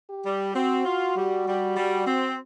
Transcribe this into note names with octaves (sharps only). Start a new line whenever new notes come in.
G4
G3
C4 F#4
F4
G3
G3
G3
C4